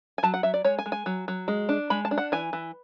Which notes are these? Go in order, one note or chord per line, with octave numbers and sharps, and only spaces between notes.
G#5
F#3 A5
F#5
F#3 E5
D5
G#3 C#5
G#5
G#3
G#5
F#3
F#3
G#3
D4
G#3 B5
A5
D4
F#5
E3 G#5
E3